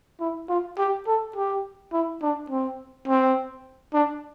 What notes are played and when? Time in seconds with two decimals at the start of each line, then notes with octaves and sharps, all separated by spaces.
0.20 E4
0.49 F4
0.78 G4
1.07 A4
1.36 G4
1.93 E4
2.22 D4
2.50 C4
3.08 C4
3.94 D4